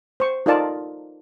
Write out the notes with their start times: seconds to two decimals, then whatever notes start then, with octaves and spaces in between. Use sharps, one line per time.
0.20 C5 C#6
0.46 D#4 F4 A4 A#4 D5 A5